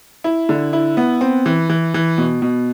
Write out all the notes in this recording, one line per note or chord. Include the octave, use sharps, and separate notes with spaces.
E4
D3
E4
B3
C4
E3
E3
E3
B2
B2